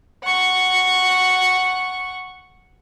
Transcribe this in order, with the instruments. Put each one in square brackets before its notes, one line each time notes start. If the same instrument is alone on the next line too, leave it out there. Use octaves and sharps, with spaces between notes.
[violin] F#5 C#6